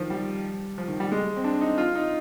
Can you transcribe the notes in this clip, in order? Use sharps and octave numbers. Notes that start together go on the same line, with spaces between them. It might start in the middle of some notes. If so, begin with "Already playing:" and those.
Already playing: D#3 F3
G3
F3
D#3
G3
G#3
C4
D4
D#4
F4
D#4